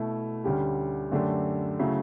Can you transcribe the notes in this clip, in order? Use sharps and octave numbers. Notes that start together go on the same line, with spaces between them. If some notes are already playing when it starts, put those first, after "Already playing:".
Already playing: B2 A3 E4
D2 D3 G3 C#4 G4
F#2 D3 A3 D4 G4
C#3 F#3 A3 E4